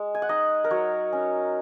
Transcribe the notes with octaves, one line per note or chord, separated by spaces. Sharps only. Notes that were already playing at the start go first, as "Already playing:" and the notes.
Already playing: G#3
G#5
F#5
D#4 D#5
A#4
F#3 C#5
C#4